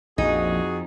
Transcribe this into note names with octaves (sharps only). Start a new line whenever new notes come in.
A#1 F2 A#2 D#4 F#4 G#4